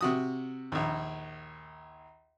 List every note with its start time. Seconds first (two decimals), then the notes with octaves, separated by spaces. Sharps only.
0.01 C3 F#4 D#6
0.72 A#1 D#2